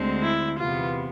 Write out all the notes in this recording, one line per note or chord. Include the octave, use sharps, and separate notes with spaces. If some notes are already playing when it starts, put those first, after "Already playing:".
Already playing: D2 D3 G#3 C4
E4
E2 C3 E3 B3 F4